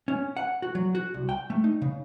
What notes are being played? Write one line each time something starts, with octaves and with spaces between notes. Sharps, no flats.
C#4
F#5
F#4
F#3
F#4
C2
G5
A3
D#4
C#3